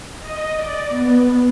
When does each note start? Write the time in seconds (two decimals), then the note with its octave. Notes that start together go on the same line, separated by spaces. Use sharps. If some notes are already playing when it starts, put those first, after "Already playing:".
0.20 D#5
0.54 D5
0.89 B3